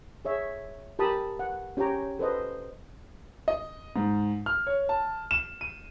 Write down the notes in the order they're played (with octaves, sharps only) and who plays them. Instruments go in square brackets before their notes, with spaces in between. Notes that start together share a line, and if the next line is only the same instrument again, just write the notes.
[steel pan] G#4 C#5 E5
G4 A#4 A5 B5 D#6
F#5
C#4 G4 C#5 G5 A#5
A4 B4 C5 D#5
[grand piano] D#5
G#2
F6
C#5
A5
E7
D#7